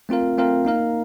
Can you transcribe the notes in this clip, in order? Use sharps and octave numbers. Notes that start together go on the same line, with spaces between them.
A3 C4 F4 A#4 F5
A3 C4 F4 A#4 F5
A#3 D#4 A#4 F5